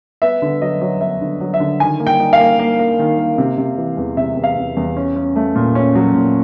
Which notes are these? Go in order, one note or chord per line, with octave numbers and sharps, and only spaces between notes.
B3 E5
D3
F#3 D#5
F#3
B3 E5
D3
F#3
E5
D3
D#3 G#5
A#3
G5
D#4
F5
A#3
A#3
A#3
D#3
A#3
C3
C3
E3
E2
C3 E5
E2
F5
E2
E2
C#4
C#4
A3
A#2
C#4
F#3
A#2